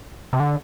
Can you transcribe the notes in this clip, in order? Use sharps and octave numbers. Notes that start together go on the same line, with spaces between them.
C3
D3